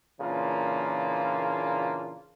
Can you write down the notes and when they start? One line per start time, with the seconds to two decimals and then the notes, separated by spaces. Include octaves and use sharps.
0.20 A#2 C#3 E3 A#3 D4 F4